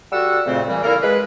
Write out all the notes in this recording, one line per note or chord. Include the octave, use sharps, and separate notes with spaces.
G3 F#4 A4 F#5 E6
F2 A#2 C#3 A3 C4
A#2 C#3 E3 G3
A#3 E4 A4 A#4
G#3 B4